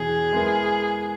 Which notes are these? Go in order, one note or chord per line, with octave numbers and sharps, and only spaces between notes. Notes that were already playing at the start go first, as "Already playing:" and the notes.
Already playing: E2 B2 E4 G#4
G#3 B3 E4 A#4